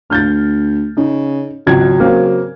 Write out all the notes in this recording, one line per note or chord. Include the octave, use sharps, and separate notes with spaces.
D2 F6 G6 A6
C#3 D#4
G#1 C#2 F#3 G#6
C#3 A#3 C4